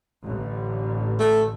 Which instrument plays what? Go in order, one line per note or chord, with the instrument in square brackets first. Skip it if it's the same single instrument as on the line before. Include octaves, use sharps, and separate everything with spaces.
[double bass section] A1 D3
[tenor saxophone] A3